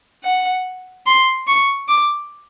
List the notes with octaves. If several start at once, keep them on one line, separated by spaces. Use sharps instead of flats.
F#5
C6
C#6
D6